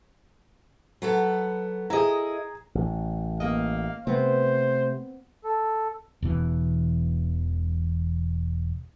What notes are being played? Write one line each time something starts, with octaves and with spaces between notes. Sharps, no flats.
F#3 B3 A4
E4 G#4 D#5 A#5
A1
A#3 D#5 F5
C3 A3 B3 C4 C5
A4
E1 B2 E3